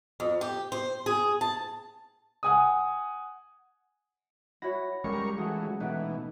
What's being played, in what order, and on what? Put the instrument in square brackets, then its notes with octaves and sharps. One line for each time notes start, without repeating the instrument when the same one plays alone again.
[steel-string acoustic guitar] F2
G4
C5
G#4
A5
[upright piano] F#5 G#5 D#6
[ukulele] E4 F#4 C#5 [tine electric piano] F#5 B5 A#6
[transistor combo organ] G3 A#4 C#6 [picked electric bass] G#3 C#4 [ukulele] A4
[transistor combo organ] E3 F#3 A3 [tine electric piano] G#4 F#5
[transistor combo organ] B2 E3 [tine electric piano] A3 D#4 [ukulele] B4 F#5 G5